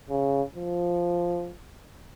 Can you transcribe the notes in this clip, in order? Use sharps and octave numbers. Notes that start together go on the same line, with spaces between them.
C#3
F3